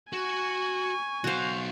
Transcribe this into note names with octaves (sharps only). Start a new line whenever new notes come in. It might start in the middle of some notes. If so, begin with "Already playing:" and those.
F#4 G#5 C#6
B1 F#4 C5 F5